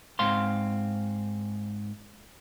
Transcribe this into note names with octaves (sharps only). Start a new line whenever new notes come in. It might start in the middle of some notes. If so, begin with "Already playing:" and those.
G#2 C4 F5 C6